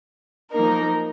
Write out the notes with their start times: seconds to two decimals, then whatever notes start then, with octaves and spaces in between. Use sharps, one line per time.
0.52 F3 A#3 D#4 A#4